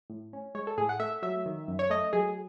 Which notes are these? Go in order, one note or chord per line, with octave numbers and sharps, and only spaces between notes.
A2
C#4
G#3 C#5
A4
A2 G#4
F#5
A3 E5
F#3 E5
D#3
F#2
C#5
A3 D#5
F#3 G#4